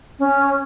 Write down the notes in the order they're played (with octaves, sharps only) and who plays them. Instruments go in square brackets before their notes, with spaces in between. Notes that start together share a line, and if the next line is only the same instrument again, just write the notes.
[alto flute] C#4